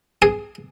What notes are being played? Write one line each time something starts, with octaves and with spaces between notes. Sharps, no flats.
G#4